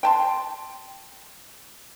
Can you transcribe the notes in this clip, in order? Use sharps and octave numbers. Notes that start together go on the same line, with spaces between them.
G5 A5 C6